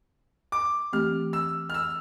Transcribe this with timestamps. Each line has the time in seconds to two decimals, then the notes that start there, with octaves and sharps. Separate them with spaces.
0.52 D6
0.93 E3 A3 C4 G4 F6
1.33 E6
1.70 F6
1.74 E6